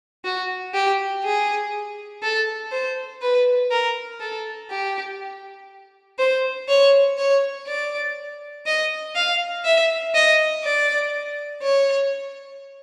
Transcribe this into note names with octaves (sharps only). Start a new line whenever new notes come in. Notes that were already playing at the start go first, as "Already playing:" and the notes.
F#4
G4
G#4
A4
C5
B4
A#4
A4
G4
C5
C#5
C#5
D5
D#5
F5
E5
D#5
D5
C#5